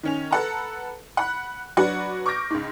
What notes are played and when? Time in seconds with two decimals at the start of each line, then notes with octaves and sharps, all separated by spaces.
0.03 D#3 C#4 F7
0.31 A4 B4 F#5 A5 A#5
1.17 F#5 B5 F#6
1.77 F#3 D4 F#4 B4 D5 F#5
2.26 C#6 D6 F6 G6 A#6 D7
2.50 C#2 G#2